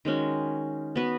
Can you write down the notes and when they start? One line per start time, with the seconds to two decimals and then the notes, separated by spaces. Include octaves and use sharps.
0.05 D#3 G#3 C#4 F#4
0.96 B3 F#4 B4